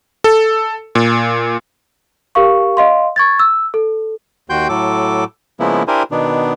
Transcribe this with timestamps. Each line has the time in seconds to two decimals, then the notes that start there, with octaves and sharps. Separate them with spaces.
0.24 A4
0.95 A#2
2.35 G4 A#4 F5 C#6
2.77 D#5 F5 C6
3.16 C#6 G#6 A6
3.39 E6
3.74 A4
4.50 D#2 F#4 G5 C6 G6
4.69 A2 F#3 A4 D6
5.60 C#3 F3 G#3 A#3 B3 E4
5.88 D4 E4 G4 A#4 C5 G#5
6.11 B2 D#3 B3 D4